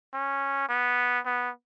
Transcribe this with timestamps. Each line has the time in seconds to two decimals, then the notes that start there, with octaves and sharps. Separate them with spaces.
0.14 C#4
0.69 B3
1.25 B3